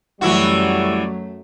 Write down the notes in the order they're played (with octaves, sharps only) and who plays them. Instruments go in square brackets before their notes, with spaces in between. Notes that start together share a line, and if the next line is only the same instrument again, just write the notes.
[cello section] F#2 A3 [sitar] E3 E4 F#4 [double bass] F#3 [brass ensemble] G3 D5